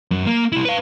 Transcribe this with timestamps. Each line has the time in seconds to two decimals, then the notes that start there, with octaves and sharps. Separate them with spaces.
0.11 F#2
0.26 A#3
0.52 C2 E4
0.65 B4 F5